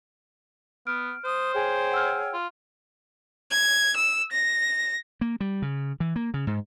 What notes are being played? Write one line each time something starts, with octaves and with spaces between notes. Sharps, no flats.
B3 F6 D7
C5 D#6
G#4 C#5 G5
F#5 E6 F6
F4
G#6
E6
A#6
A#3
G3
C#3
E3
A#3
C#3
G#2